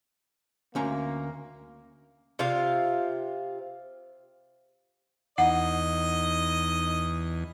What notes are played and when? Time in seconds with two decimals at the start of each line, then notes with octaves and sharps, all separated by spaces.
0.75 D2 A#3 C#4 A#5
2.39 C3 F4 F5
5.38 E2 D#4 D#5 F#5